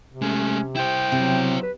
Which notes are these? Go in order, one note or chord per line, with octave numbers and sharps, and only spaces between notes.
C3
G#3 A3 C#4
E4 C5 G5
C3 F#3
B4